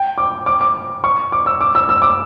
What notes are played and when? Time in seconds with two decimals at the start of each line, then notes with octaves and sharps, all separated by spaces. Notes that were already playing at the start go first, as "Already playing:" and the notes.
Already playing: G5
0.18 D6
0.46 D6
0.61 D6
1.04 C#6
1.32 D6
1.46 E6
1.61 D6
1.75 E6
1.89 E6
2.02 D6